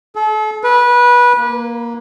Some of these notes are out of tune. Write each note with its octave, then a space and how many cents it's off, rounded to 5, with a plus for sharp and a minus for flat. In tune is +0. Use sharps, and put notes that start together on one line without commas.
A4 -40
B4 -20
A#3 +10